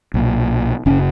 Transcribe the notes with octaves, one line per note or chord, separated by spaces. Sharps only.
B1 A#2
F#1 C#3 C#4